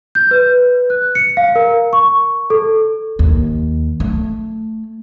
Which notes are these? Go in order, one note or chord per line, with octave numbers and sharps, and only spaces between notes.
G6
B4
F#6
C#7
F5
A#4
C#6
A4
D#2
A3